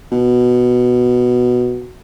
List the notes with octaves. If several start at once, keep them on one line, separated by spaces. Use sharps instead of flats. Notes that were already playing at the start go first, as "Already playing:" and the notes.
B2